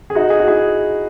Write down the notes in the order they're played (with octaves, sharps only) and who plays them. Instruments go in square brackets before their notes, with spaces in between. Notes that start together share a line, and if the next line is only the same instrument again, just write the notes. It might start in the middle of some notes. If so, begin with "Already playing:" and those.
[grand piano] G#4
D#4 F#4
G#4
F#4
E4 G#4